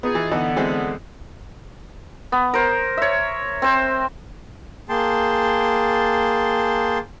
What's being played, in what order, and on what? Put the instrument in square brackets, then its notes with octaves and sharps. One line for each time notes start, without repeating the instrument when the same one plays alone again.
[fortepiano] B3 [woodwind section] D#4 F4 G#4
[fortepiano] E3
[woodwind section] D3 B3 [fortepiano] E3 D#4
[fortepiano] E3 G#3 C4
[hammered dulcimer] B3
A#4 C5
C#5 E5
C4 C5
[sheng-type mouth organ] A#3 G#4 G5 A5 C6